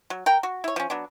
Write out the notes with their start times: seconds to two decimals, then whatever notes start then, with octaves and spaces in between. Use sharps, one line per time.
0.10 F#3
0.26 A#4 G5
0.43 F#4
0.64 E4 C#5
0.76 F3 C#4
0.90 F#3 B3 D4